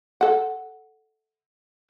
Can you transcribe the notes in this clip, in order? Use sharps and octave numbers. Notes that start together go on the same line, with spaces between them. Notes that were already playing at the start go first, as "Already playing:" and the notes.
A4 F#5